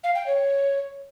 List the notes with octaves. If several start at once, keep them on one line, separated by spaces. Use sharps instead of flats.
F5
G5
C#5